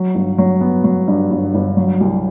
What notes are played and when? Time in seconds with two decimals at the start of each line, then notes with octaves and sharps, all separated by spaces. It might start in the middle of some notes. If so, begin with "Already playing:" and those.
Already playing: F#3
0.15 G1
0.38 F#3
0.61 B3
0.84 F#3
1.08 G2
1.31 G1
1.55 G1
1.77 F#3
2.00 C2